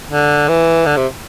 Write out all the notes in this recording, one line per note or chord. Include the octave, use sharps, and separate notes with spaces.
D3
E3
D3
C3